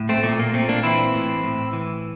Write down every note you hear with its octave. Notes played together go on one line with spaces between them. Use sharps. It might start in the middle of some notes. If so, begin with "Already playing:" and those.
Already playing: A2
A3 C4
A#2 A3
A#3
A#2 A3 C4
A#3 D4
E3 C4 E4
A2
A2
E3